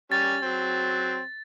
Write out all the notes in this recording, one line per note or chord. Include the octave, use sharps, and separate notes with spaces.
G3 C#4 A6
F#3 C4